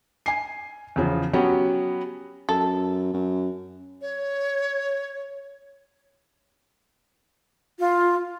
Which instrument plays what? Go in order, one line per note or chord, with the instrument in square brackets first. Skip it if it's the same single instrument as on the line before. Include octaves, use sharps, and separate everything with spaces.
[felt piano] G#5 C7
E2 C#3 F3
F#3 B3 C#4 F#4 G4
[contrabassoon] F#2 [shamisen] A4
[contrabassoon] F#2
[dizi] C#5
[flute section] F4